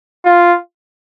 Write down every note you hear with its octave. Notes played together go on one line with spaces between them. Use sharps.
F4